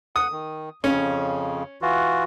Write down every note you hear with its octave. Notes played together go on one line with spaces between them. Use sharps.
F#5 D#6
D#3
F2 C#3 C#4
E3 F4 F#4